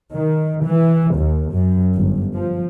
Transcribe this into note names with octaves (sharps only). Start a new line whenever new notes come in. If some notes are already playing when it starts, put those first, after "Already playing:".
D#3
E3
D#2
F#2
G1
F3